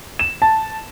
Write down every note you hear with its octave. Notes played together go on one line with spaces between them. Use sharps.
E7
A5